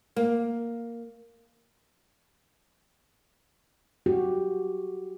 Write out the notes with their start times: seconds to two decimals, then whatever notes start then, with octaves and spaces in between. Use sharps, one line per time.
0.16 A#3
4.06 F#4 G4